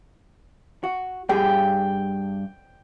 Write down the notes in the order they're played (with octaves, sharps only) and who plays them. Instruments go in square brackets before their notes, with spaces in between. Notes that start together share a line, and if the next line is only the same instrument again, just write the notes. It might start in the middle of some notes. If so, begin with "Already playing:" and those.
[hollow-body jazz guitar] F#4
[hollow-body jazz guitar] G2 G4 G#4 [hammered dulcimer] G5